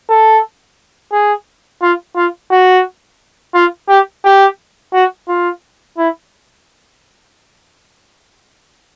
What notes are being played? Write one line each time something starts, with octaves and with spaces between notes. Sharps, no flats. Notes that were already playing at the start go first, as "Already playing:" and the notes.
A4
G#4
F4
F4
F#4
F4
G4
G4
F#4
F4
E4